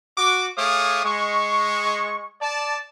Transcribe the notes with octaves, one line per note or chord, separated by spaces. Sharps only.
F#4 D6
A3 G#4 C#5 F5 D6 D#6
G#3 C#6
D5 A5